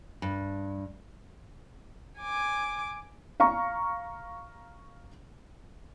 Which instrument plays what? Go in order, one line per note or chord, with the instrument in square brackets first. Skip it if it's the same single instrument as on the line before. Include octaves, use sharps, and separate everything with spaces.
[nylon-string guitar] G2
[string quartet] G#5 D6
[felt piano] F5 A#5 C#6